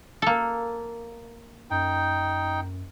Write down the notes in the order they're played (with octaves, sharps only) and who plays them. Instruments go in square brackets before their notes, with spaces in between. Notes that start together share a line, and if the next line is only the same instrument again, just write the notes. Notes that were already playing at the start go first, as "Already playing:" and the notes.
[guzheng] A#3 A4
[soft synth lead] F#2 [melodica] D#4 G5